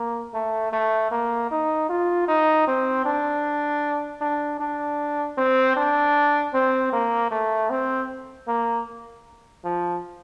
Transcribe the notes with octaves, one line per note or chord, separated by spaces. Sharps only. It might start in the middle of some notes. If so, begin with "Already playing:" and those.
Already playing: A#3
A3
A3
A#3
D#4
F4
D#4
C4
D4
D4
D4
C4
D4
C4
A#3
A3
C4
A#3
F3